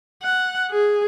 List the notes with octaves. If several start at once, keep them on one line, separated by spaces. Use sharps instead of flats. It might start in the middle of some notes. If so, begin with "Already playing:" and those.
F#5
G#4